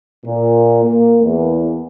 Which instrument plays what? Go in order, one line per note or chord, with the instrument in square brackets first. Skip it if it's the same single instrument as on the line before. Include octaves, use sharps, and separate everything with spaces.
[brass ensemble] A#2
A#3
E2